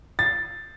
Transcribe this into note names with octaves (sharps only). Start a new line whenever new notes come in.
A6